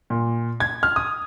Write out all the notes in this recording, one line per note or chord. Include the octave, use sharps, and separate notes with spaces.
A#2
G#6
F6
D#6